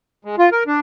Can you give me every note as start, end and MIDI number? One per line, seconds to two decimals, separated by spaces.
0.25 0.36 56
0.38 0.49 65
0.52 0.63 70
0.67 0.80 62